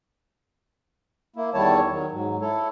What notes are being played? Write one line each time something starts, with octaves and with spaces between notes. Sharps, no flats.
A#3 E4
E2 D#3 G3 E4 C#5 A5
D#3 F#3
G#2 F#3
E4 A4 C#5